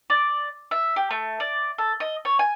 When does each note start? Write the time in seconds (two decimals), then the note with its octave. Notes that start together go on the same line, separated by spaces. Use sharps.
0.10 D5
0.71 E5
0.96 G4
1.11 A3
1.40 D5
1.78 A4
2.00 D#5
2.25 C#5
2.39 G#5